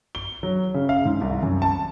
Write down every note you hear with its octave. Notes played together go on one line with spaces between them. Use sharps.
G7
F#3
C#3
F5
G#2
C2
F#2
A5